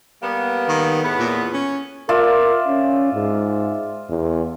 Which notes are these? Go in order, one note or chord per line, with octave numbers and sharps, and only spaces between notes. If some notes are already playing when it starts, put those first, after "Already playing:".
G3 A#3 B3
D#3
E2 A2 B3
A#2
C#4
F4 A#4 D5 E5
C#4
G#2
E2